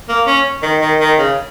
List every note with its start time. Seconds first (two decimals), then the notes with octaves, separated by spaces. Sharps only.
0.09 A#3
0.26 C#4
0.63 D#3
0.81 D#3
1.00 D#3
1.18 C#3